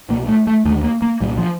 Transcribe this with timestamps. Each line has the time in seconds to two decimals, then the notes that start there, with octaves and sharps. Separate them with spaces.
0.09 C2 B2 A#3
0.28 A3
0.47 A3
0.65 D#2 D3 A3
0.83 A#3
1.02 A#3
1.20 C2 A#2 G3
1.38 F3